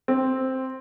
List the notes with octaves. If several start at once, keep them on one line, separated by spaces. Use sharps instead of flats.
C4